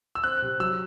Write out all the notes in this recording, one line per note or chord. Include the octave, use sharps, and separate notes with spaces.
E6
C4 F#6
C3
F#3 E6